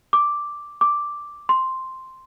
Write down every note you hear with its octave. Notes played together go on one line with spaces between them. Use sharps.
D6
D6
C6